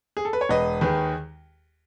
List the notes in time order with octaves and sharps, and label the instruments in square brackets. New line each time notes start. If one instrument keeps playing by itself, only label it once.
[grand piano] G#4
A4
B4
C#5
E1 B4 D#5
D#2 D#3 G#4 B4